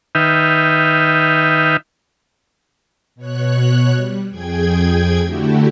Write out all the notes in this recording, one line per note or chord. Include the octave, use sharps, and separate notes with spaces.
D#3 D#4 B4 E5 G5 F6
B2 C#5 F#6
G3
F2 G#4 G5 G#6
D3 A3 E4 F#4 G4